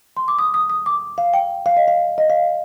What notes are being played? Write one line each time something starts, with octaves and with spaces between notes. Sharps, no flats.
C6
D6
D#6
D#6
D#6
D6
F5
G5
F5
D#5
F5
D#5
F5